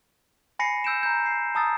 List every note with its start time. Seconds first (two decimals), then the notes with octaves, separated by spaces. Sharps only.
0.59 G#5 B5 A#6 C7 C#7 D#7
0.84 E6 G6 D7 E7
1.03 A#5 G6
1.26 C7
1.55 A5 A#5 D#6 E6 A6